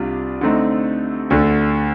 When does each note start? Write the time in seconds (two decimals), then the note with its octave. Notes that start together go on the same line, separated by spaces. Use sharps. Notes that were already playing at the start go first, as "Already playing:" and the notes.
Already playing: C2 C3 G3 D4 F4
0.41 D3 A3 C4 D#4
1.30 D2 D3 A3